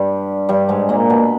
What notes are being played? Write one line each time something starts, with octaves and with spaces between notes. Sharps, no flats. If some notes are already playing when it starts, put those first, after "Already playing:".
Already playing: G2 G3
G2 G3
G#2 G#3
A#2 A#3
B2 B3